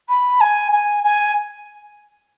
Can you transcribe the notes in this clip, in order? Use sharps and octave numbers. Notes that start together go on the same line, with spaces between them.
B5
G#5
G#5
G#5